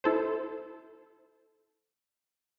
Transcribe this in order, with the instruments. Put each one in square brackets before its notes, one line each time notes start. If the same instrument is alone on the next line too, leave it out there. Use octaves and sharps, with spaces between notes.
[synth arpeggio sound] E4 A4 C5